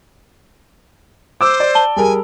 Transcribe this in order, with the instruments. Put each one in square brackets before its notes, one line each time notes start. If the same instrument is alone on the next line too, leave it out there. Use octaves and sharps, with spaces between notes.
[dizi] C5 [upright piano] D6 E6
[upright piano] D5
[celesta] A5 G7
[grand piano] G3 G#4 A#4 [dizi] G#5